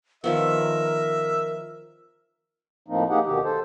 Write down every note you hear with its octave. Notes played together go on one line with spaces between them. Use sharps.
D#3 F3 B3 A#4 E5
A2 F3 A#3 C4 D#4
A#3 D#4 G4 G#4 F#5
D2 B2 D#3 G4
A4 C5